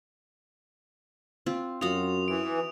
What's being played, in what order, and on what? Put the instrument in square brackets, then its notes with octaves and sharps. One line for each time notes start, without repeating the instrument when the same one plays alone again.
[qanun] C4 F4
[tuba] F#2 [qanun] F4 F#4 [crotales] D#6 F7
[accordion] E3 [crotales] D7